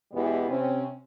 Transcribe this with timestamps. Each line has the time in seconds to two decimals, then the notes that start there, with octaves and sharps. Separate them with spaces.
0.12 E2 B2 G#3 B3 E4 G4
0.47 C3 C4 C#4